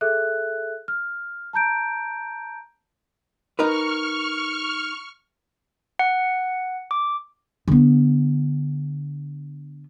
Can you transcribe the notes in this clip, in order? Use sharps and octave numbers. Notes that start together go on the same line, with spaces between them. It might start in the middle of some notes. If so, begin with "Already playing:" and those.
G#4 A4 E5 F#6
F6
A5 A#5 G6 D7
D#4 A#4 B4 C#6 F6
F#5
D6
D3 B3